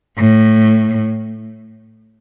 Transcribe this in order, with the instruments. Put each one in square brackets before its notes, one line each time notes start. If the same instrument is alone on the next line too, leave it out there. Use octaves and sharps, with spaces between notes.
[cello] A2